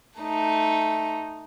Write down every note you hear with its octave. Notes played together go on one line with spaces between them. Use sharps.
A3 D#4